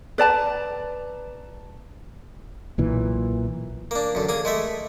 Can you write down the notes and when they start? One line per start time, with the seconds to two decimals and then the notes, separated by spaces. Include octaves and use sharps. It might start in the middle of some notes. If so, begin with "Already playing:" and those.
0.18 B4 D5 A5 A#5
2.78 B1 A#2 E3
3.91 A#3 D4
4.15 F#2 D3
4.29 A#3 G#4
4.45 G#3 A3 E5